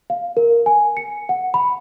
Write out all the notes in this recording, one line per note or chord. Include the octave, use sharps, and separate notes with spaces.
F5
A#4
G#5
C#7
F#5
B5